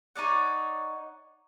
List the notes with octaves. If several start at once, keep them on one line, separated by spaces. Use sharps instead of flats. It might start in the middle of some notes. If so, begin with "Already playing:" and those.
D#4 C#5 D5 F#5